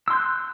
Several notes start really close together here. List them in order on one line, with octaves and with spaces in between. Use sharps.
E6 C6 G6 F#6